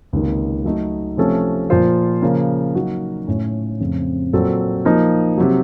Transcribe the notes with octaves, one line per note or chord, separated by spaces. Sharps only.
C#2 C3 D#3 A#3 D#4
F#3 A3 D#4
C3 F3 A3 C#4 A4
A#2 F3 A#3 F4 C5
C#3 F3 A#3
F#3 A#3 D#4 F#4
A2 A3 C#4
F2 C#3 A3 C4
A#2 F#3 C4 F4 A4
F3 A#3 D#4
C3 F#3